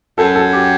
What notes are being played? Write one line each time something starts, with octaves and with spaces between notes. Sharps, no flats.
F#2 A4
A4
G4